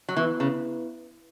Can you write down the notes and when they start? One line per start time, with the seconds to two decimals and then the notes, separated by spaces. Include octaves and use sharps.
0.09 F#3
0.17 E3 B3 E4 B4
0.40 C#3